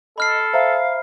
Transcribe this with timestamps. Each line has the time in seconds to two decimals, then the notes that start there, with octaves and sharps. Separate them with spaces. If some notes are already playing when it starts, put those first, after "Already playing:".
0.18 A4 D#5 B5 F6 C7
0.53 C5 E5 F5 A#5